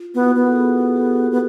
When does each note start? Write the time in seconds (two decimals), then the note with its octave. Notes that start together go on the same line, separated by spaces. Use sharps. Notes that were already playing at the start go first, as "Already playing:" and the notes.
Already playing: F4
0.15 B3 E4 F#4
0.27 B4
0.35 B3 A#4
0.46 A4
0.55 F#4 G#4
0.87 G#4
0.96 G4 A4
1.31 B3